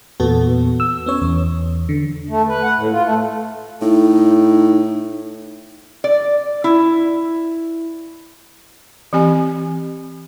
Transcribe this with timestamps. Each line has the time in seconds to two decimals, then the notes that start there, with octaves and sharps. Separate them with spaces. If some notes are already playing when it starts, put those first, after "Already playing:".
0.20 E2 A#2 B3 F#4 A4
0.80 E6
1.06 B3 C#4 C#5
1.22 E2
1.89 D3
2.30 A3
2.49 B4
2.63 F#5
2.77 A2
2.92 F4
3.04 A3
3.82 A2 D#4
6.04 D5
6.64 E4
9.13 E3 C4 G4 G#5